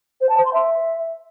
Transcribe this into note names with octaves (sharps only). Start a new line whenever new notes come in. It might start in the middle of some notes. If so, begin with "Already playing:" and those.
C5
A5
C5
C6
E5